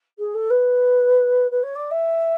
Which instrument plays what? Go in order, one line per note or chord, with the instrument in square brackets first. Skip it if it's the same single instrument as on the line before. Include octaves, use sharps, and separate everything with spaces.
[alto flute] G#4
A4
B4
B4
C#5
D5
E5